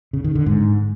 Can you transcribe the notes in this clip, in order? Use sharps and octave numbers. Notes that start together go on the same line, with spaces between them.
C#3
D#3
D3
G#2